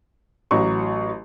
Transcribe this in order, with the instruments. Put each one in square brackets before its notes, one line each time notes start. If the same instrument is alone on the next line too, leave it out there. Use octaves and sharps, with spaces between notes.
[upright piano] A1 F#3 C#6